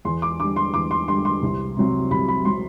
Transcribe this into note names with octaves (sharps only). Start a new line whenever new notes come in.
E2 C6
D6
D3 G3 D6
C6
E2 D6
C6
D3 G3 C6
C6
C2
C3 F#3 C4
C2 B5
B5
C3 F#3 C4 C6